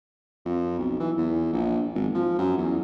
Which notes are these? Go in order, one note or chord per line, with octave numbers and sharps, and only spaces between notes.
F2
B1
E3
E2
A#1
G#1
F3
F#2
E2